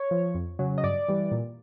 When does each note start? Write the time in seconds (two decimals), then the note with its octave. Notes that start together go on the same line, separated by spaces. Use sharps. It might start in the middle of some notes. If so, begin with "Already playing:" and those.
Already playing: C#5
0.11 F3
0.35 F2
0.59 C#3 F#3
0.78 D#5
0.84 G2 D5
1.08 E3 G3
1.32 A#2